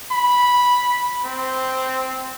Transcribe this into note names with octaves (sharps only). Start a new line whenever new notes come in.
B5
C4